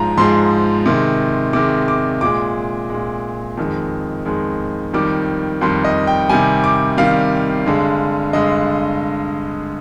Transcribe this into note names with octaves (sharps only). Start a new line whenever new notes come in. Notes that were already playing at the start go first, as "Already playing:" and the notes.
Already playing: G#2 F3 G#3 A#5
G#2 F3 G#3 C6
C3 D#3 G#3
C3 D#3 G#3 D6
D6
A#2 G#3 D6
A#2 G#3
F2 D#3 G#3
F2 D#3 G#3
F2 D#3 G3 D6
F2 D#3 G3 C6
D#5
G5
C3 D#3 G3 G#5
D6
C3 D#3 G3 F5
G2 D3 G#3
G2 D3 G#3 D#5